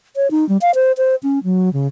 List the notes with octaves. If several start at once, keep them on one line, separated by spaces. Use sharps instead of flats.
C#5
D#4
G3
F5
C5
C5
C#4
F#3
C#3